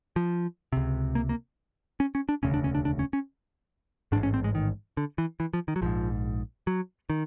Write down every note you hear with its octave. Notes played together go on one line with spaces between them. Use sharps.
F3
C#2 C3
A#3
A#3
C#4
C#4
D4
E1 D2 C#3 C#4
D4
C#4
D4
D4
C#4
C#4
A1 G#2 D4
C#4
C4
G#3
D#3
D3
E3
E3
F3
D#3
F#3
A#1 G#2 F3
F#3
D#3